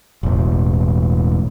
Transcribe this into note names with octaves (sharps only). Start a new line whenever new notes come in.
E1 A1